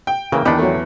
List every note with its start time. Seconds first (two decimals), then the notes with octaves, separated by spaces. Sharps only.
0.07 G5
0.32 C#3 E3 A#3 A#4
0.45 E2 D#3 D4 E4 G4 B4 D#5 B5
0.58 F#3 A3